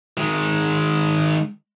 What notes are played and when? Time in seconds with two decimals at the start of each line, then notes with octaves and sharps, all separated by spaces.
0.17 D#3 G#3